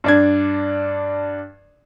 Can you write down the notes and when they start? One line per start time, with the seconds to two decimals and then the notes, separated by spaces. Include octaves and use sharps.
0.04 G2 D4 G#6